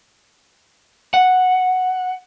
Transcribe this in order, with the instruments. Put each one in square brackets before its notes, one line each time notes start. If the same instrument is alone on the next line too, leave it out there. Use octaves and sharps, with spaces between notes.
[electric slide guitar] F#5